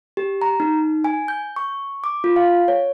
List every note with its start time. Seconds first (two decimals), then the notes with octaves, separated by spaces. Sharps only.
0.17 G4
0.42 A#5
0.60 D#4
1.04 G#5
1.28 G6
1.56 C#6
2.04 D6
2.24 F4
2.36 F5
2.68 C#5